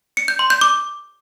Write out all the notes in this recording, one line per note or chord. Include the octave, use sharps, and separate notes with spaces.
C#7
G6
C6
G6
D6